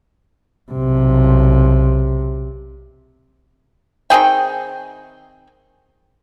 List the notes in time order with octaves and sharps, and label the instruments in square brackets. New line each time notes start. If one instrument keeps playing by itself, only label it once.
[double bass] B1 C3
[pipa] D#3 C4 G#4 G5